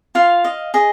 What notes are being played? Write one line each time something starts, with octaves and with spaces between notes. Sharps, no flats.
F4 F5
D#5
G#4 D#5